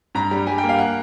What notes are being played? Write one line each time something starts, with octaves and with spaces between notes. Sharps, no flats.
G2 A#5
G3
G3 G#5
G5
A#3
F5
F#5